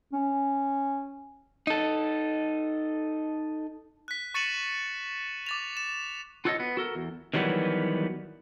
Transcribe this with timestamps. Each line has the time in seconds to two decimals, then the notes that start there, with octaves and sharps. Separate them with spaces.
0.13 C#4
1.67 D#4 A4
4.08 F#6 B6
4.34 C#6 A6 C#7 D#7 E7 F#7
5.46 D6 A6 F7
5.77 E7
6.45 F4 F#4 A4 C5 C#5 D#5
6.60 B3
6.77 F#4 A4 A#4
6.95 E2
7.34 D#3 E3 F#3 G3 B3